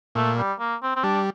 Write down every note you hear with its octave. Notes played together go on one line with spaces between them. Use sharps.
A#2 A3
G3
A#3
C4
C4
G3 D4